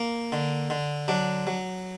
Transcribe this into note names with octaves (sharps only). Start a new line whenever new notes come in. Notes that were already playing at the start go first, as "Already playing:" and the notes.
Already playing: A#3
D3
D3
F#3 D4
F#3